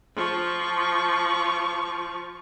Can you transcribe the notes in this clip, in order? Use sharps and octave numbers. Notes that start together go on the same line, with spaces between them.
F3 C#6